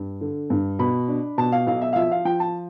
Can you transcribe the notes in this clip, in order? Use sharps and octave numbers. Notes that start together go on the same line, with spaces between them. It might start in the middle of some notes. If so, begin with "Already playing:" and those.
Already playing: G2
D3
G2
B2 B5
D4
B2 A5
F5
B1 F5
E5
F5
F3 E5
F5
F3 G5
A5